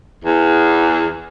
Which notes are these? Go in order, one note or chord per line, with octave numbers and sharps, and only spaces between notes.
E2